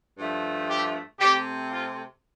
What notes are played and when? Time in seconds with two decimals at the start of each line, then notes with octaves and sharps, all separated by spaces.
0.17 G2 F3 A3
0.69 G4
1.20 C3 A3 C4 G4
1.71 F4